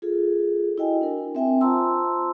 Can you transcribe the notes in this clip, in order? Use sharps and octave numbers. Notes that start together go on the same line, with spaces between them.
F4 G#4 A4
E4 F#4 D#5 G5 G#5
D4 A#4
C4 E5 G5 G#5
F4 C5 A5 A#5 C6 E6